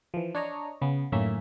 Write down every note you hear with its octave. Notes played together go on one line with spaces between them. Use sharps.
E3 F3
D4 C#5 D#5 A#5
C#3 B3
F#2 A2 D#3 A#3 C#4 E5